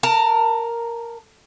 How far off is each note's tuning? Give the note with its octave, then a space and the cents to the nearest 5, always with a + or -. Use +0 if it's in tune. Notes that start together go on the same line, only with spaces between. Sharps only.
A#4 +0 A5 +20